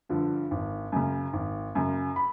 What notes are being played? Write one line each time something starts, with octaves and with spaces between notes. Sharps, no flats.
G2 D3 F3
G#1
F#2 C#3
G#1
F#2 C#3
B5